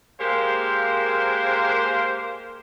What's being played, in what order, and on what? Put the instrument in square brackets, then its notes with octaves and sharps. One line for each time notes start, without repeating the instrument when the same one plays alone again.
[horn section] G#3 A#3 G4 A#4 C5 F5